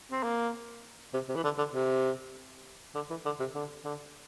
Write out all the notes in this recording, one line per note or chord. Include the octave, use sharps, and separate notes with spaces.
C4
A#3
C3
C3
E3
D3
D3
C3
D3
E3
D3
C3
D3
D3